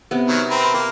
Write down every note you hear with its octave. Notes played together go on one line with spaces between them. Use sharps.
C3 B3
D#3 F#3
C4 A#4 B4
A#3 A#4